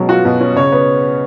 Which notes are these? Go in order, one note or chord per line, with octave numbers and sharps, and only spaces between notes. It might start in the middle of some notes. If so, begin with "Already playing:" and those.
Already playing: B2 F#3 G#3 C#4
F4 F#4
B2
C#4
C#3 C#5
B3